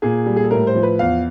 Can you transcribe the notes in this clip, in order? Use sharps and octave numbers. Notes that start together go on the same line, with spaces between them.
A#2 G#4
G3
G#4
A4
A2 A#4
C5
F3
B4
E2 F5